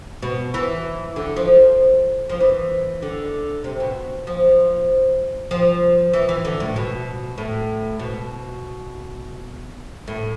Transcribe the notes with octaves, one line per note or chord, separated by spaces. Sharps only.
B2
E3
D3
F3
F3
E3
D3
C3
B2
F3
F3
E3
E3
D3
A2
B2
A2
B2
A2